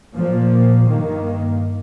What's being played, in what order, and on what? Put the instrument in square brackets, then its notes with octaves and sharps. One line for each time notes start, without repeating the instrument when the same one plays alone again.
[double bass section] A#2 F3 A#3
G2 D#3 A#3